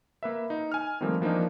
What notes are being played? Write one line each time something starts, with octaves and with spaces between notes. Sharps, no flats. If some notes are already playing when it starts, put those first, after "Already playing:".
A#3 B4 E5
D#4
G#5 F6
D#3 F3 G3 A3 A#3 C4
E3 F3 A#3 D4 D#4